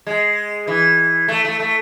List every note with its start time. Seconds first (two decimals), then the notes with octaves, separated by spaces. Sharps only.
0.07 G#3
0.67 E3
1.28 A3
1.45 A3
1.60 A3